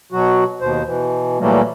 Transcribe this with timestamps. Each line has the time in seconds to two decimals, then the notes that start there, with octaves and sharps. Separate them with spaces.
0.12 B2 F#3 F#4
0.61 D#2 B2 C5
0.85 B2 E3
1.40 A#2 E3 F#3 G3 A3 A#3